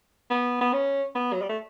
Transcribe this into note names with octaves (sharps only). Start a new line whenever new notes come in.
B3
B3
C#4
B3
F#3
G3
A3